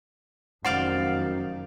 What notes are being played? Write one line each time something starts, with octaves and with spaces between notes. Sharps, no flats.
F1 F#2 D#3 C5 D5 F5 F#5